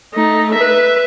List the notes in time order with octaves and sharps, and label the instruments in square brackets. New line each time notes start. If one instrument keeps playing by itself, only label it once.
[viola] A3 D#4
B4 E5